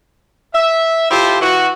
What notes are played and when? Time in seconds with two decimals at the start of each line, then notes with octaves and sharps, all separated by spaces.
0.54 E5
1.11 E4 F4 G4 A4 C5
1.41 E3 F#4